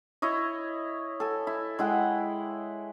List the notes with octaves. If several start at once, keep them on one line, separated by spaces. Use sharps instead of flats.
E4 C#5 D#5
A4 G#5
E4
G#3 E4 F#5 G5